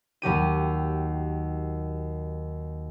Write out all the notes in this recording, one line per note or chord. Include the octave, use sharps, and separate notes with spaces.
D#2 F#3 G4 D#7